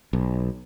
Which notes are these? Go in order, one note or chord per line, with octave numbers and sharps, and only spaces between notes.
B1